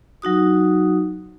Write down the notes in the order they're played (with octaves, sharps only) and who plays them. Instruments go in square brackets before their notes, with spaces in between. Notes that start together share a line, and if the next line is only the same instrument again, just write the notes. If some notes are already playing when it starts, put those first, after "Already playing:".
[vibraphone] F#3 D#4 F#4 D#6